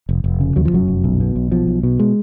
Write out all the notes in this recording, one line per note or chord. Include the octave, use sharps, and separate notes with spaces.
F1
F1
C#3
D#2 F#3
F3
F1 F#2 F#3
F1
B1
B2
B1
B2 F3
B1
B2
G#3